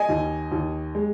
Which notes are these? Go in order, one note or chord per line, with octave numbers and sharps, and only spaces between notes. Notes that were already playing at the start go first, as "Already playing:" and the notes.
Already playing: D#5 G#5
D#2
D#2
G#3